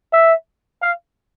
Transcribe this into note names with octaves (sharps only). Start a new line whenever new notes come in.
E5
F5